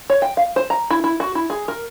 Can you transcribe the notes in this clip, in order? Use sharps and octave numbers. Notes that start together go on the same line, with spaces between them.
C#5
G5
F5
C5
A#5
E4
E4
F#4
E4
G#4
A#4